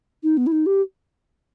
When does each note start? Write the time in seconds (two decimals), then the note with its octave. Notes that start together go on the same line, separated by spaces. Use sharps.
0.23 D#4
0.37 B3
0.47 E4
0.52 D#4
0.66 G4